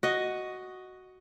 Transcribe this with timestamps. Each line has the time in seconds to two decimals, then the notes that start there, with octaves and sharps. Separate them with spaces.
0.03 F#4 D#5